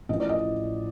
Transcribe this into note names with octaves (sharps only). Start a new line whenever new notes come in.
A1 A2 F3 D#5
D5
D#5